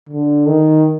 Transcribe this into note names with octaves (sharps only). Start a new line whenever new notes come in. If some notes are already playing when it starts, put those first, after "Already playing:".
D3
D#3